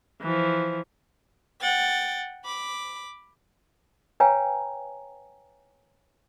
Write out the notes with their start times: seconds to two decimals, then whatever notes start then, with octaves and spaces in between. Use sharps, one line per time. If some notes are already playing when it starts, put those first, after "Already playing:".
0.22 E3 F3
1.61 F#5 G5 A6
2.44 B5 D6
4.20 B4 C#5 F5 G5 G#5 A#5